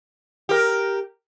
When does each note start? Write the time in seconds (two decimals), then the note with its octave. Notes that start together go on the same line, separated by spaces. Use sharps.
0.49 G4 A#4